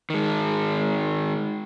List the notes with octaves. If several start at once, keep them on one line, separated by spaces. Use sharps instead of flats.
D#3 G#3